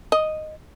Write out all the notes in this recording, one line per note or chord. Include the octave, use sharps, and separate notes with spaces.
D#5